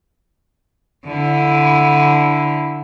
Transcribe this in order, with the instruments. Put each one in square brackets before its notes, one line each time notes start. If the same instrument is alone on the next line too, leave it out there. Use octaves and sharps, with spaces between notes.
[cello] D3 E4